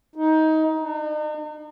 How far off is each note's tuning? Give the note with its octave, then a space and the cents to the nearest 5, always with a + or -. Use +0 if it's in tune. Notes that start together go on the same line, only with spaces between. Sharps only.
D#4 +20
D#4 -45